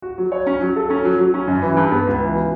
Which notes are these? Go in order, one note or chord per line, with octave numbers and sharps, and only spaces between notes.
F#4
F#3
C#5
C#4
F#3
A4
C#4
F#3
F#3
C#4
F#2
E3
G2
B3
C#2
E3
B2